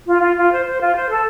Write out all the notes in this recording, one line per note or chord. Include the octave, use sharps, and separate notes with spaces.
F4
F4
F4
C5
C5
F4
C5
A4